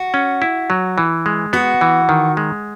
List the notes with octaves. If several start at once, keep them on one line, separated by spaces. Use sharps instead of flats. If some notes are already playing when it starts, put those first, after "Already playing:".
Already playing: F#4
C#4
E4
F#3
E3
G#3
B3 F#4
E3
D#3
G#3